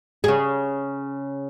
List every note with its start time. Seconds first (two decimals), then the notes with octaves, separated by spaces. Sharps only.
0.24 C#3 G#4